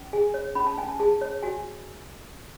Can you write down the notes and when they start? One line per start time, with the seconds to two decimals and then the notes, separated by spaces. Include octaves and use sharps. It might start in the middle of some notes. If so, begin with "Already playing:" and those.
Already playing: C#4
0.13 G#4 G#5
0.34 C#5
0.55 C#4 B5
0.67 A5
0.77 C#4 G#5
0.89 A5
0.99 G#4 A5
1.21 C#5
1.43 F#4 G#5